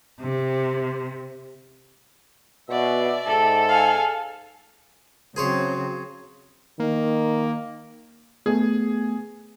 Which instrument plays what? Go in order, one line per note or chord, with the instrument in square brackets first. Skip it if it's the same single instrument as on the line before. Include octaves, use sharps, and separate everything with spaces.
[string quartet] C3
[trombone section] B2 [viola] D5 E5
[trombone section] G#2 [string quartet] A4
[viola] F5 G#5
[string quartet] C#3 F#3 C4 [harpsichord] G#4 C5 C#5
[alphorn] D#3 [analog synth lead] A#3
[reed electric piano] A3 B3 [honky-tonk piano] G#4